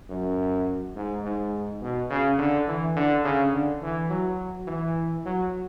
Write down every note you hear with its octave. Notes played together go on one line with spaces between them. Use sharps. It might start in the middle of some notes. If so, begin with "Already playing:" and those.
F#2
G#2
G#2
B2
C#3
D3
E3
D3
C#3
D3
E3
F#3
E3
F#3